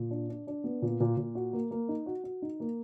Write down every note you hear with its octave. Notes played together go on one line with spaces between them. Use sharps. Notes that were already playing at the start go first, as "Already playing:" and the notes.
Already playing: A#2
D4
D4
D4
B3
A#2
A#2
A#2
F#4
A#3
A#3
D#4
F#4
F#4
D#4
A#3